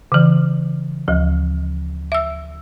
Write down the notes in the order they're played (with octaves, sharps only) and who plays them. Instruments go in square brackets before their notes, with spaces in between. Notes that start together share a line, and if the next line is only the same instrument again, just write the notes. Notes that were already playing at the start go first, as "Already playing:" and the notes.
[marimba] C#3 E3
D2 F3
E5 E6